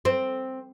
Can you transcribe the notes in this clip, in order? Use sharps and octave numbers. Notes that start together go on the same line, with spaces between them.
C4